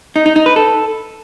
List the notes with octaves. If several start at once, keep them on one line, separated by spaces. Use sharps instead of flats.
D#4
D#4
D#4
B4
A4